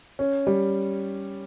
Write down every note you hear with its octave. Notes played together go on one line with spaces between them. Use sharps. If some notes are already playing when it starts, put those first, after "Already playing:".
C#4
G3